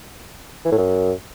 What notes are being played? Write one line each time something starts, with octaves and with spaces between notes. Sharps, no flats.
E3
A2
F#2